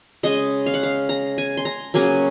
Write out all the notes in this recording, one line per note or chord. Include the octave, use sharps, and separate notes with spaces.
C#3 G#3 D#5
F5
F#5
F5
A#5
G#5
C6
A#5
C#3 F#3 A#3 G#5